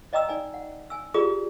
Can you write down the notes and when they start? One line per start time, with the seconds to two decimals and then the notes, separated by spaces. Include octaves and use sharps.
0.13 D5 D#5 G5 A#5 D#6 E6
0.29 D#4 D5 G#5
0.54 F#5
0.90 G#5 E6
1.14 F4 G4 G#4 D5 A#5 D#6